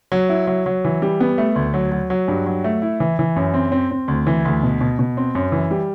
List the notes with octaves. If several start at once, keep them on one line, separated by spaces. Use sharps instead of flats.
F#3
E4
F#3
F#3
E3
G3
B3
A3
D2
F#3
F#3
F#3
G2
F#3
A3
E4
E3
E3
F#2
C4
C4
C4
D2
E3
D2
B2
B2
B2
C4
F#2
E3
G3